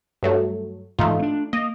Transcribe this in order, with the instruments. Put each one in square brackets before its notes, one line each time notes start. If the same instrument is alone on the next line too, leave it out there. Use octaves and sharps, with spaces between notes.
[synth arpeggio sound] G2 F#3 A3
[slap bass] G#2 E3 [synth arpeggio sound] A3 D#4 F4
[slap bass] C4 D4
[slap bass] A#3 [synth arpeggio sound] D#5